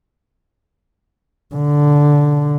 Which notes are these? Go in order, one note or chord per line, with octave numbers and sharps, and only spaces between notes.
D3